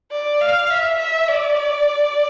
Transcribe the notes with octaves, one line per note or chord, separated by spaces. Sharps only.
D5
F5
E5
E5
D5